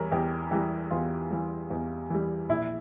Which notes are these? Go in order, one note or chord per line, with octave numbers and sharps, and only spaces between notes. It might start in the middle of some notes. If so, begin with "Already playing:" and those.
Already playing: E2 E3 G3 A#4 C#5
E2 G4
E3 G3 G4
E2 F4
E3 G3
E2
E3 G3
A#1 E4